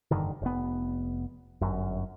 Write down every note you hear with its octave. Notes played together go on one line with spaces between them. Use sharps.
F1 G2 D3 D#3
F1 B3
G1 F#2